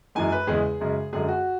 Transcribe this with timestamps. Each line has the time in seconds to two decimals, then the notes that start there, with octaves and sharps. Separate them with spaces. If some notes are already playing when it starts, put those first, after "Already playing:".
0.15 F#2 E3 G#3 G#5
0.32 B4
0.47 E2 C#3 G#3 G#4
0.80 F#2 C#3 G#3
1.13 F#2 D3 G#3 G#4
1.28 F#4